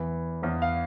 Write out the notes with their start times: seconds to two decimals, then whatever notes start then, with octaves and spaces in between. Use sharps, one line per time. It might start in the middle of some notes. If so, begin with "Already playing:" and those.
Already playing: E2 E3
0.42 E2 E3
0.62 F5